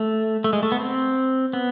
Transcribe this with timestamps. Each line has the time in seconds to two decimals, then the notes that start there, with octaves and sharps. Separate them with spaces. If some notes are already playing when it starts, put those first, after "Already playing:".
Already playing: A3
0.44 A3
0.53 G#3
0.63 A3
0.72 B3
0.80 C4
1.53 B3